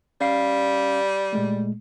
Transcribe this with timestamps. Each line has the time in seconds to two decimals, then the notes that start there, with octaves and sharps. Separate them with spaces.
0.21 G3 C#4 F5 C7
1.33 A#2 G#3 A3